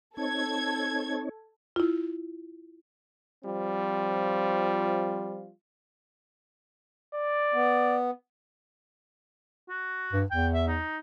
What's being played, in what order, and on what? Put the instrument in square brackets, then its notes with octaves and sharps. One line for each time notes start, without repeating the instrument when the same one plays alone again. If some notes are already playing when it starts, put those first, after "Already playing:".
[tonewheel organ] C4 D#4 C#5 [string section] A4 G#6
[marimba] E4 F4
[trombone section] F3 G3 C4 F4
[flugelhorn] D5
[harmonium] B3
[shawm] F#4
[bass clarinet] G2
[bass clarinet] E2 [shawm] G5
[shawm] E5
D#4